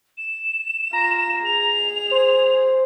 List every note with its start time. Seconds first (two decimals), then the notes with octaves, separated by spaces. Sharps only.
0.17 E7
0.93 F4 A#5
1.45 G#4 F7
2.11 C5